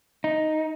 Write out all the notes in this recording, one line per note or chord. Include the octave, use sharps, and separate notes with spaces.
D#4